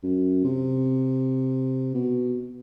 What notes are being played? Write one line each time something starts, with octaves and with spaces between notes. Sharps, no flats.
F#2
C3
B2